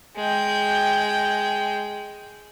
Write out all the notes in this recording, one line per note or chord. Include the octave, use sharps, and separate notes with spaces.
G#3 G5